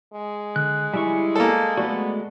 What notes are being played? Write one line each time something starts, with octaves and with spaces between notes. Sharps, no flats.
G#3
D3 F#6
G3 E4 G#5 C#6
A#3 A4
G#3 A3 B3 F#4 D5